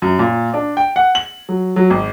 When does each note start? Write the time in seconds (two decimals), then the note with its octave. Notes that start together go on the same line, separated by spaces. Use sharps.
0.02 F#2
0.19 A#2
0.54 D4
0.77 G5
0.96 F#5
1.15 F#7
1.49 F#3
1.76 F#3
1.90 G#1